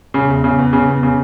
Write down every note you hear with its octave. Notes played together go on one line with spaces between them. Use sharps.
C#3
E1
C#3
E2
C#3
E2
C#3